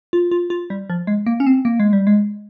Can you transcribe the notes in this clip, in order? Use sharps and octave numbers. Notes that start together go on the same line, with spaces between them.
F4
F4
F4
G3
F3
G#3
A#3
C#4
C4
A#3
G#3
G3
G#3